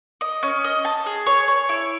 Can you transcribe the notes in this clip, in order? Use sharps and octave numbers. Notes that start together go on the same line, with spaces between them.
D#5
C#4
D#5
A5
G#4
C#5
C#5
E4